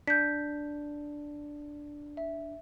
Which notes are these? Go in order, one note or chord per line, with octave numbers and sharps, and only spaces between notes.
D4 G6 B6
E5